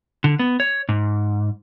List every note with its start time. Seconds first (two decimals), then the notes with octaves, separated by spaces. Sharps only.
0.24 D3
0.39 B3
0.60 C#5
0.89 G#2